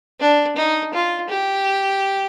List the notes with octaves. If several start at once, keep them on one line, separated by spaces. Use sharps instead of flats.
D4
D#4
F4
G4